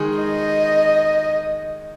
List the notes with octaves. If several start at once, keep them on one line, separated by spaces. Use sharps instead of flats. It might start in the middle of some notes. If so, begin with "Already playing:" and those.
Already playing: D#3 G#3 D#4 G#4
D#5